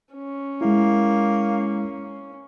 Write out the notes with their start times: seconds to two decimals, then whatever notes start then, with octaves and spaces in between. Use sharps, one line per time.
0.15 C#4
0.61 G#3 A#3 E4